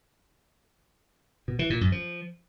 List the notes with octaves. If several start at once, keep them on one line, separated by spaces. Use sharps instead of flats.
B2
E3
A#2
F#2
F3